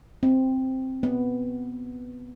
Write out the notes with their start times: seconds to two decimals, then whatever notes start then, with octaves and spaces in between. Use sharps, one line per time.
0.23 C4
1.03 B3